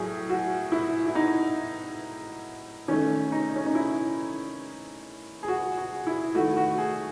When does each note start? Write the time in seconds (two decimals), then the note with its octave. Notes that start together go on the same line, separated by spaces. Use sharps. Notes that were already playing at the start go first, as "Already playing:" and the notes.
Already playing: A2 F#3 G#4
0.29 F#4
0.72 E4
1.06 E4
1.15 D#4
2.88 D#3 A3 C#4
3.32 D#4
3.56 C#4
3.66 D#4
3.75 E4
5.43 G#4
5.48 F#4
5.77 F#4
6.07 E4
6.35 D#3 A3 F#4
6.57 F#4
6.78 G#4